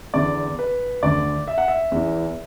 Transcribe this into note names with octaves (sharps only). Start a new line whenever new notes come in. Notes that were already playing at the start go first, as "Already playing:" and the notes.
E2 D3 D5
B4
D2 D3 D5
E5
F#5
E5
E2 E3